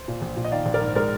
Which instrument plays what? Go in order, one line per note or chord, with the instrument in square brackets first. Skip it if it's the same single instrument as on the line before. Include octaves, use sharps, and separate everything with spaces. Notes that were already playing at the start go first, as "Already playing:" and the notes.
Already playing: [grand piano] C5
A#2
A#1
A#2
D#5
D#3 D5 F5
A#1
A#4 D5
G#2
G#3 A#4 D5